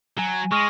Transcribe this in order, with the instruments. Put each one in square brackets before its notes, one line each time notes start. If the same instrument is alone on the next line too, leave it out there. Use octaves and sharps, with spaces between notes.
[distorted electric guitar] F#3 [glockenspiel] G#5
[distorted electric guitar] G#3 [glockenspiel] C#6 F6 A#6 D#7